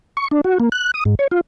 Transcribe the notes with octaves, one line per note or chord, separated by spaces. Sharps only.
C#6
D4
F#4
A#3
F#6
D#6
G#2
C#5
F4